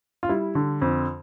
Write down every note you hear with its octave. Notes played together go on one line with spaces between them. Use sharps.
F4
G3 E4
D3
F2